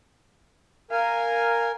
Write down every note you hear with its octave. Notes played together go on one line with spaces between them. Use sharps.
A#4 F5 G#5